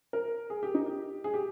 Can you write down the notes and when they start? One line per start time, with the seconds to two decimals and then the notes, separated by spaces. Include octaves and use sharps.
0.13 A#4
0.50 G#4
0.63 G4
0.74 D#4
0.86 G4
1.24 G#4
1.34 G4